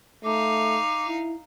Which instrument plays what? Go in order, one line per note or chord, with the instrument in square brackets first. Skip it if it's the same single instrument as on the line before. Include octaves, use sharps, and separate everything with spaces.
[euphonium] A3 [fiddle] D#4 F5 [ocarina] D6
[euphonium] E4